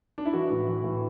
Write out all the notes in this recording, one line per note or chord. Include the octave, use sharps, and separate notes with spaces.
D4
E4
E3 F#4
A2
E3
A2